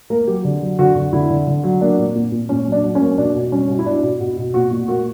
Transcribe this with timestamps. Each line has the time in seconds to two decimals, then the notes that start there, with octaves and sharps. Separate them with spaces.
0.10 A#3 A#4
0.27 F#3 G4
0.44 D3
0.62 F#3
0.79 D3 F#4
0.96 D3
1.13 D3 E4
1.30 D3
1.47 D3
1.64 F#3
1.81 A#3 D4
1.98 A#2
2.15 A#2
2.32 A#2
2.49 A#2 C#4
2.66 F#3
2.72 D4
2.84 F#3
2.95 C#4
3.01 A#3
3.18 B2 D4
3.35 B2
3.52 G3 C#4
3.69 B2
3.79 E4
3.86 B2 D4
4.03 B2
4.20 B2
4.37 B2
4.54 A#2 F#4
4.71 A#2
4.88 A#3 F#4